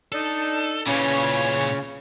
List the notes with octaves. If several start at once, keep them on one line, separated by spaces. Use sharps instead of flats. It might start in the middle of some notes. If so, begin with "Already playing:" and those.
D4 D#4 A4
A#2 C#3 E3 C#4 F4 C#5